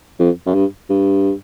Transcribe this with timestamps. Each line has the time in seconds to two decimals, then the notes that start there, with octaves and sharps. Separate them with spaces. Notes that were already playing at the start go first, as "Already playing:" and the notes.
0.19 F2
0.46 F#2
0.54 G2
0.90 G2